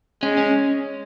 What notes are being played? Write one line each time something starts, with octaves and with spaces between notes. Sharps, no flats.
G#3 C#4
C#4